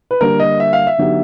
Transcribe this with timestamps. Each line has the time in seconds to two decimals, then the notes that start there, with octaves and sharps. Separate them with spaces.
0.11 B4
0.20 D3 G3 A#3 D4 A#4
0.40 D#5
0.60 E5
0.73 F5
0.87 E5
0.98 D3 F#3 B3 D#4 G4